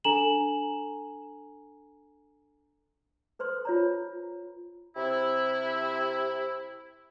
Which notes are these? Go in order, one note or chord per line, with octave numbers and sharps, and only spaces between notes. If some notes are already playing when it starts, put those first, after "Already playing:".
D4 A4 G#5 A#5 E7 F#7
A4 B4 C5 C6
F4 C#5 A#5
C3 E4